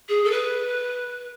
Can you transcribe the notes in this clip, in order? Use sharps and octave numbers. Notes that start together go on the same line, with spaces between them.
G#4
A4
B4